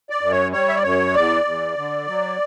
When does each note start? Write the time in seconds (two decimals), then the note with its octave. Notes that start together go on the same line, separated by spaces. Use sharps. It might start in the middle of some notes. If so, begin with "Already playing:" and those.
0.10 D5
0.21 F#2
0.31 C#5
0.51 G3 C#5
0.68 E5
0.76 D5
0.83 F#2 C#5
1.14 E2 D5
1.45 E2
1.77 D3
2.08 F#3